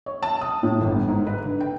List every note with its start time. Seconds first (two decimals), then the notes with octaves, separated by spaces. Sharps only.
0.06 C#5
0.23 A5
0.41 D#6
0.63 A2
0.81 G1
1.08 G#2
1.27 B4
1.44 D3
1.60 G5